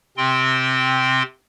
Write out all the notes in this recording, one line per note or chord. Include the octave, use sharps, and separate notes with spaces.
C3 C4 G5 C6